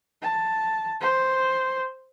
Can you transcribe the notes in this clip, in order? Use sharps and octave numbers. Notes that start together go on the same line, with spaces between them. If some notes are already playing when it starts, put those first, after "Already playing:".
A5
C5